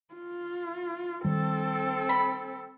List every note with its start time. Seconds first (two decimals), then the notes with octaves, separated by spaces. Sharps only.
0.14 F4
1.25 D#3 G3 C4 A4
2.09 B5